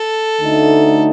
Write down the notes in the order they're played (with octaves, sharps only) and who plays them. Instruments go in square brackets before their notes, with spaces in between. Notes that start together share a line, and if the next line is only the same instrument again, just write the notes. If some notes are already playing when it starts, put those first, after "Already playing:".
Already playing: [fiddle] A4
[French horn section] D2 D3 A3 D#4